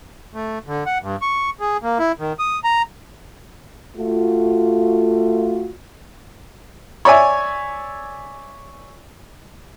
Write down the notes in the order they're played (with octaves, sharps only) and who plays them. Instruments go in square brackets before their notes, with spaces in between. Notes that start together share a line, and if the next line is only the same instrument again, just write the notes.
[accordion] A3
D3
F#5
G2
C#6
G#4
A#3
E4
D#3
D#6
A#5
[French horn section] A3 F4 F#4
[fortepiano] C#5 D5 E5 G#5